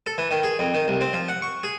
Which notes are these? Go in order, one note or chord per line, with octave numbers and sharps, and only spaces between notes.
A4
E3
D#3
G#4
F2
D#3
C2
C4
F3
F#5
C#6
G#4